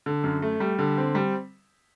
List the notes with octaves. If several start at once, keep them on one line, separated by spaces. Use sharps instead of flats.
D3
F#2
A3
G3
D3
C4
G3